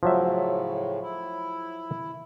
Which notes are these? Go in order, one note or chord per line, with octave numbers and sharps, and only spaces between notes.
A2 C#3 F3 F#3 E5
E4